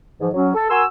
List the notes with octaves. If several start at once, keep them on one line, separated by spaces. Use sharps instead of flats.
G#2 E3 F3
F#3 C#4
A4
F#4 A#4 G#5 C6 E6